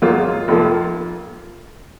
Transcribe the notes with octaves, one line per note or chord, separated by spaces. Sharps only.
G#1 G#2 F#3 A#3 F4
F1 F2 F3 A#3